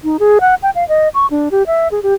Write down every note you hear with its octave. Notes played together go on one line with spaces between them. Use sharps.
D#4
G#4
F#5
G5
F5
D#5
C#6
D4
G4
E5
G#4
G4